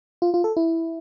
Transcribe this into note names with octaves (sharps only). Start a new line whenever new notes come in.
F4
F4
A4
E4